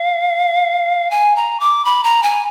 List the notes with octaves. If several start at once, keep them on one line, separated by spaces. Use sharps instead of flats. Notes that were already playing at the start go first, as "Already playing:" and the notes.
Already playing: F5
G#5
A#5
D6
B5
A#5
G#5